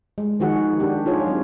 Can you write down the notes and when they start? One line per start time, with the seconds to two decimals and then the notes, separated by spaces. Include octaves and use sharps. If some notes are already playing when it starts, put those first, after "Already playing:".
0.18 G#3
0.40 D#3 F3 D#4 F#4 G#4 F#5
0.80 D4 G4
1.05 D#4 F4 G#4 C#5
1.27 F#3 C4